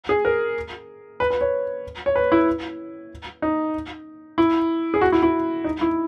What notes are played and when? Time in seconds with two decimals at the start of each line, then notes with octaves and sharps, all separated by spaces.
0.09 G#4
0.25 A#4
1.20 B4
1.30 B4
1.41 C#5
2.06 C#5
2.16 B4
2.32 E4
3.42 D#4
4.38 E4
4.94 G#4
5.01 F#4
5.12 E4
5.23 E4
5.64 D#4
5.81 E4